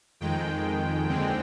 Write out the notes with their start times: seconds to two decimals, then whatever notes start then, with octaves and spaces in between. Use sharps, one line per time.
0.20 F2 D#3 G#3 G5
1.07 D#2 D3 G#3 C4